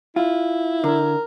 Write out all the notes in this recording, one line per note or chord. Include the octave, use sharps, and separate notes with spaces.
E4 F4
D3 A#4